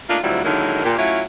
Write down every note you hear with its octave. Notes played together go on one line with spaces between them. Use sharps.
A3 A#3 D4 D#4 F4
D2 F#3 G3 C4 E4 F4
D3 D#3 F#3 G#3 A#3 E4
A#2 G4
A2 F#3 C#4 E4 F4 C#5